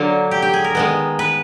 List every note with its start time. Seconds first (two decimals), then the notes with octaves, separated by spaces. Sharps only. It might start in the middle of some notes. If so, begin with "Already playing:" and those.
Already playing: D3 F#3 A#3 D4
0.31 G4
0.42 G4
0.53 G#4
0.64 A#4
0.75 D#3 G#3 B3
1.19 B4